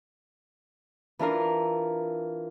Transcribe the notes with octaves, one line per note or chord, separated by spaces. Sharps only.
E3 D4 F4 A#4